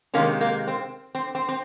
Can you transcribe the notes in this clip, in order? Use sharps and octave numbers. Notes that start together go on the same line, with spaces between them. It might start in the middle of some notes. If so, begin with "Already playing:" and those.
C3 D#3 G#3 A#3 C#4
A#3
C4
C4
C4
C4